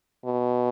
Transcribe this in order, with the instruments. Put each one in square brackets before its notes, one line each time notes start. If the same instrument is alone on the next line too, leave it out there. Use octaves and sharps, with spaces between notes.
[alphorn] B2